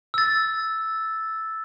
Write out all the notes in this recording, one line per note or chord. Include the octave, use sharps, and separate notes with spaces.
E6 A6